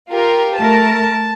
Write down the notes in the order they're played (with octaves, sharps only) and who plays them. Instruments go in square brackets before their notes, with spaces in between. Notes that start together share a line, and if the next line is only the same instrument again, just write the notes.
[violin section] F4 G4 A#4
[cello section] A3 A#4 [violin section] A5